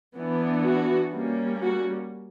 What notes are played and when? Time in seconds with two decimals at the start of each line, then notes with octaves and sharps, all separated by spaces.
0.16 E3 B3 D4
0.65 F#4
1.14 G3 A#3 C#4
1.63 F#4